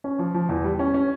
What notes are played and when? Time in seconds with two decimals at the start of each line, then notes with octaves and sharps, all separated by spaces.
0.04 C#4
0.19 F3
0.34 F3
0.49 E2
0.64 G3
0.79 C#4
0.94 C#4